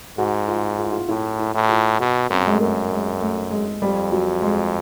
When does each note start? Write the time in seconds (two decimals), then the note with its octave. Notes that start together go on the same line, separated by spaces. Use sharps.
0.18 G#2 F#4
0.48 F4
0.79 F4
0.86 E4
0.93 F4
1.09 A2 E4
1.39 E4
1.54 A2
1.69 F4
2.00 B2 F#4
2.30 F#2 C4
2.46 G#3
2.53 A3
2.60 F#2 A#3
2.91 G#3
3.21 A3
3.51 G#3
3.82 F2 G3
4.12 F#3
4.42 G#3